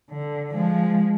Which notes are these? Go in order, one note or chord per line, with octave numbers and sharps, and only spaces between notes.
D3
F3 G#3